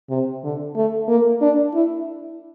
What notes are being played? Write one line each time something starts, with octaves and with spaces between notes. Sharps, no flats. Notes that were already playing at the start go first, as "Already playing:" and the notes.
C3
D3
A3
A#3
D4
E4